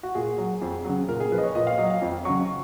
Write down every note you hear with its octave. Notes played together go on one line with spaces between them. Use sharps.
F#4
A#2 G#4
F#3
F2
C#3 F#3
A#2 A#4
G#4
F3 B4
D#5
C#5
A#2 D#5
F5
F#3 D#5
F5
F2
C#3 F#3 C#6